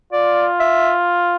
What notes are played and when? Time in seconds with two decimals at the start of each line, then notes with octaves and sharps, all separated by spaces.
0.13 F4 D5
0.60 E5